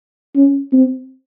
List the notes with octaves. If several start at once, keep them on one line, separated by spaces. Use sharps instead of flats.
C#4
C4